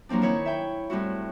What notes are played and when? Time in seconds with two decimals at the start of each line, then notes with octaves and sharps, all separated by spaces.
0.09 F3 F#3 A#3 C4 D4
0.22 D#3 E4 C#5 B5
0.46 E5 G5 B5
0.90 A2 G3 C4 E4 F#4